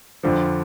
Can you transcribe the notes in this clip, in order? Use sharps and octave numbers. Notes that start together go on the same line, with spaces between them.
F2 D3 F3